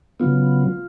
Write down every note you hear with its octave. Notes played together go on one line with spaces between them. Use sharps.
C#3 F#3 B3 F4